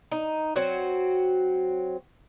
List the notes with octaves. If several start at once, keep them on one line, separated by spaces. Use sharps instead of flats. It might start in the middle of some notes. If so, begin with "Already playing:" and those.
D#4
F#3 C4 F#4